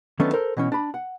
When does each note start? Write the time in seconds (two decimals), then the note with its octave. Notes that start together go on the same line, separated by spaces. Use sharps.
0.19 D#3 F#3 A3 B3 C#4 D4
0.33 A4 A#4 C5
0.57 B2 E3 C#4
0.72 D4 B5
0.94 F#5